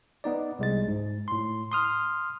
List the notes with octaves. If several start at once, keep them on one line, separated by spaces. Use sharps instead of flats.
B3 D#4 D5
C2 G#3 A6
G#2
A2 C6
C6 D#6 F6